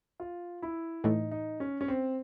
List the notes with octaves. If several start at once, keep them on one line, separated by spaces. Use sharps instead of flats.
F4
E4
A2 E3 A3 D#4
D#4
C#4
C#4
C4